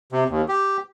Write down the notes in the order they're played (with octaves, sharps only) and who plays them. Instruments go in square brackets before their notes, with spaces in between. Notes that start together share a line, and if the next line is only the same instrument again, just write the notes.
[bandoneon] C3
D#2
G4